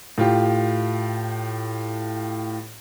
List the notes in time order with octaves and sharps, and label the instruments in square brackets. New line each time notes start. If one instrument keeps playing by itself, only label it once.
[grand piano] A2 F4 G4